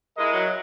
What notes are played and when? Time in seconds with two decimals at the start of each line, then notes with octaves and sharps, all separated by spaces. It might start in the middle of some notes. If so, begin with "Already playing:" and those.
0.17 G#3 E4 A#4 D#5
0.33 F#3